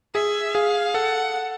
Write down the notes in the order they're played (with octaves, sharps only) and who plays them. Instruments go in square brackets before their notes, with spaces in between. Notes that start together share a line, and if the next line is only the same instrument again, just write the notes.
[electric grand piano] G#4 [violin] E5
[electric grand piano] G#4 [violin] F5
[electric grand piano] A4 [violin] F#5